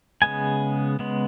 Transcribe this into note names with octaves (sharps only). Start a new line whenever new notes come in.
C#3 G#3 B3 G#5
C#3 G#3 B3